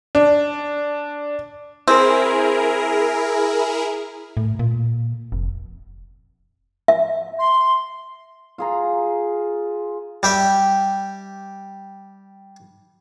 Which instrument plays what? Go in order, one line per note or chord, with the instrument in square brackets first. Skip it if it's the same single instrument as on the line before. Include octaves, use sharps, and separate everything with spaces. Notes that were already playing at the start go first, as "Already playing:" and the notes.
[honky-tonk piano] D4
[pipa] C4 [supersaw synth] E4 G#4 A#4
[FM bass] A2
A#2
F1
[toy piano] E5
[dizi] C6
[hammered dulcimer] F4 G#4 A#5
[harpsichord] G3 G4 E5